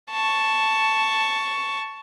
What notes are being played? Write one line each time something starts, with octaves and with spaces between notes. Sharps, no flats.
A5 C#6